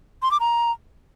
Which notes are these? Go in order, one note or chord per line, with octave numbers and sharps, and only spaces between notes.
C6
D6
A#5